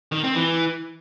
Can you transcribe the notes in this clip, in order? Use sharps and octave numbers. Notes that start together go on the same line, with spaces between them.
D#3
C4
E3